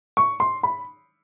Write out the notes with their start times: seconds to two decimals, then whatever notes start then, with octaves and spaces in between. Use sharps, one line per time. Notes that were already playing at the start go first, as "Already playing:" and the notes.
0.17 C#6
0.40 C6
0.63 B5